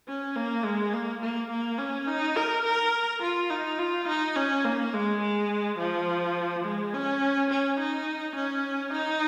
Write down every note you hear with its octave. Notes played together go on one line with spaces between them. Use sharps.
C#4
A#3
G#3
A#3
A#3
A#3
C#4
D#4
A#4
A#4
F4
D#4
F4
D#4
C#4
A#3
G#3
G#3
F3
G#3
C#4
C#4
D#4
C#4
D#4